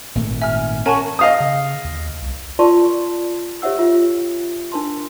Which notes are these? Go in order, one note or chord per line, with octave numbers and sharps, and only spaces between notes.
G#1 A#2 A3
E5 G#5 F6
C#4 A#4 F#5 G#5 A5 C#6
D#5 F5 D#6
C#3
D#2
C2
F4 A#4 D5 A5 C6 C#6
G4 C#5 E5 F#5 E6
F4 E5
D4 A#4 A5 C6